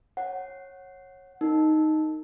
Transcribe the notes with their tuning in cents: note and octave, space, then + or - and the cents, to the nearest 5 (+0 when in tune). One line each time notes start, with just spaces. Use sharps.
C#5 -20 F#5 +0
D#4 +0 A#4 -30